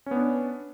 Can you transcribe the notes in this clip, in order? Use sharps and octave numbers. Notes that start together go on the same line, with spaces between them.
B3 C#4 D4